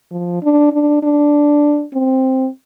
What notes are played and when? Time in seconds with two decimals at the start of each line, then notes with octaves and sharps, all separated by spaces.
0.12 F3
0.43 D4
0.73 D4
1.03 D4
1.94 C4